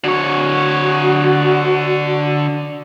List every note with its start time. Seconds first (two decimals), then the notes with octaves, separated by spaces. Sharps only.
0.04 D3 F#4 C#5